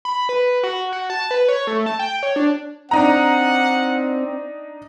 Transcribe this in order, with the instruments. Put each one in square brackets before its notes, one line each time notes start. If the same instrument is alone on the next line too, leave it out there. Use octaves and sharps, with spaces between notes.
[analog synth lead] B5
B4
F#4
F#4
A5
B4
C#5
A3
A5
G5
C#5
D4
[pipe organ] C4 [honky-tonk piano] D4 D#4 A#5 [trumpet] F#5